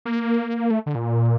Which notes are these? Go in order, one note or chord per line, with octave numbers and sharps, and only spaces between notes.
A#3
A3
D3
A#2